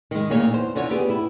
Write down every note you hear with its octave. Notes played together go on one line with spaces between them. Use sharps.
D#3 G#3
D2 A#2 A#3 D#4 G#4 C#5
E2 C5
E2 D3 F4 C#5
B3 G4 G#4
E4